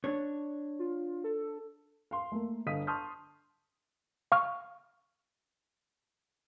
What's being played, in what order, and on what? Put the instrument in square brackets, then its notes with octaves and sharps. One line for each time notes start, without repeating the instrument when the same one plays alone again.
[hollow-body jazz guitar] D4 C#5
[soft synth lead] F4
A4
[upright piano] F5 C6
A3 A#3
G1 D#5 F5 D#6 B6 D#7
A5 C6 C#6 D#6 F6 G6
[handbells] F5 C#6 F6